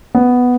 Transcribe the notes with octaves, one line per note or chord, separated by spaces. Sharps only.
B3